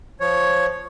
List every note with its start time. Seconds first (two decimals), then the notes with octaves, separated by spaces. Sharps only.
0.20 F3 C#5